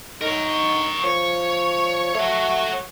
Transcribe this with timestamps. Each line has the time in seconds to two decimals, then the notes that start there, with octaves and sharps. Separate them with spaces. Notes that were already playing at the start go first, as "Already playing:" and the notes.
0.21 D#4 A#4 C#5
1.04 F3 C#5
2.15 A3 F#4 C#5